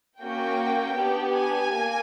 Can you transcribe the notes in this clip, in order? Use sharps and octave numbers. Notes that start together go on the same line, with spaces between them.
A#3 C#4 F#4 G5
B3 D4 G4
G#5
A#3